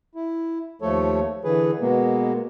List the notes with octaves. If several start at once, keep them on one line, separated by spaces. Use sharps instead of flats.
E4
D#2 F3 A3 A4 C#5
D3 E3 G#4 B4
B2 G#3 A#3 B3